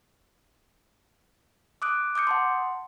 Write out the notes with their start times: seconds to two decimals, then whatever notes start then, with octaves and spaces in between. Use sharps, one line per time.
1.82 D6 D#6 F#6 D7
2.15 D6 D#6 G6 C#7
2.27 F#5 A5 C6